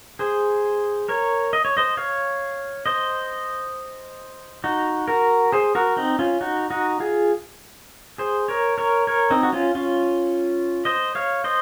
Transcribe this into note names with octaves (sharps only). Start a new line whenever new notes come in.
G#4 C5
A#4 C#5
D#5
C#5
C5 D#5
C#5 F5
C5 D#5
D#4 F#4
F#4 A#4
G#4 C5
F#4 A#4
C4 D#4
C#4 F4
D#4 F#4
D#4 F#4
F4 G#4
G#4 C5
A#4 C#5
A#4 C#5
A#4 C#5
C4 D#4
F#4
C#4 F4
C#4 F4
C5 D#5
C#5 F5
C5 D#5